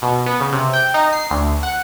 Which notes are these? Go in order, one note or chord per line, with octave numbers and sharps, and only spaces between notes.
B2
B3
C#3
C3
G5
D#4
C7
D2
F#5